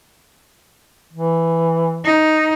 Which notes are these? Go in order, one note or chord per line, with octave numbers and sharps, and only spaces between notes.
E3
D#4